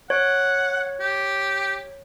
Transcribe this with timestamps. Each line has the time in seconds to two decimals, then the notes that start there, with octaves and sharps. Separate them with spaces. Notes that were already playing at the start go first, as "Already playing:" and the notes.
0.10 C#5 F#5
1.00 G4